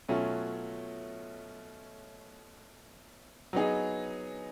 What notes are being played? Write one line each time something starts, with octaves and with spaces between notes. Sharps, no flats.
B2 F#3 A3 C#4 F4
F#3 B3 D#4 G#4